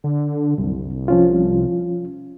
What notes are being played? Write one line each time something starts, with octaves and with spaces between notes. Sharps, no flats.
D3
C2 F#2
F3 C#4 F4